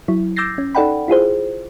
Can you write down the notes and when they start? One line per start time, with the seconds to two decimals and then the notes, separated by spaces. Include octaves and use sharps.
0.08 F#3 E4
0.36 D6 E6 G6 A6 A#6 C7
0.58 C#4
0.75 D#4 A4 D5 F#5 G5 B5
1.08 E4 F4 G#4 C5